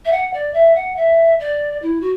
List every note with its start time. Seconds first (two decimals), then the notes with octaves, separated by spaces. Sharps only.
0.05 E5
0.12 F#5
0.33 D5
0.54 E5
0.76 F#5
0.96 E5
1.39 D5
1.82 E4
2.01 F#4